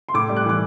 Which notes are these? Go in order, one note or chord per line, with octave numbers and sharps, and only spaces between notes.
C6
A2 D6
G3
F#6
E3 D6